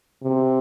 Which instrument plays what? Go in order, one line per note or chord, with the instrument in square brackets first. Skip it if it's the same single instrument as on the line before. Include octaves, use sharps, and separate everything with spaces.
[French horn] C3